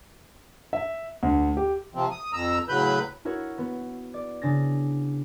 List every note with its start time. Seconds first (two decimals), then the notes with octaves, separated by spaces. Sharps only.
0.73 E5
1.23 D2
1.57 G4
1.95 C3 F3 C4
2.11 D#6
2.33 F2 A#5 E6
2.69 A2 C#3 F#3 B4 B5 G6
3.25 E4 F#4 A#4 C#5 C#6
3.58 B3
4.14 D5
4.42 C#3 D4 A6 A#6